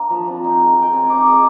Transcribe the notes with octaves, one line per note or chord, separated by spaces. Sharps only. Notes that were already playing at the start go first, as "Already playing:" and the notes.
Already playing: A#3 D4
F3
C4
D#4
G#3
G#3
G5
C4 G#5
D#4 D6
G#3 D#6